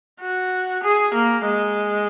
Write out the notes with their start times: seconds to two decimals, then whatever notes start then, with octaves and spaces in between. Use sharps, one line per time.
0.21 F#4
0.83 G#4
1.14 A#3
1.46 G#3